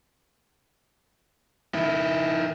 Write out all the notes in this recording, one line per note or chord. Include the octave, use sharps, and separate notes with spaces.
D#3 E4